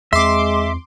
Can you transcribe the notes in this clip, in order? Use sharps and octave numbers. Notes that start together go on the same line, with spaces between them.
E2 G#3 A#3 C4 E5 C6 D6